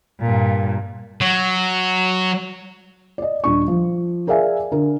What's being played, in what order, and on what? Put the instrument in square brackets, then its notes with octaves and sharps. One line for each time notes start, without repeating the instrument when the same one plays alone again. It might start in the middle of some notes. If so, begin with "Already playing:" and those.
[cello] G2 A#2
[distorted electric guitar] F#3
[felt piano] D5 D#5
D#1 D4 C#6
F3
G#4 A#4 D5 E5 F5 G#5
D3 A#4